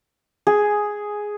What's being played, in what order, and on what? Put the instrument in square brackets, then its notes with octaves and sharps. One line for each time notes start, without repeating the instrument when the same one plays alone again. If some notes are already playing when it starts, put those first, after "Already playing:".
[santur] G#4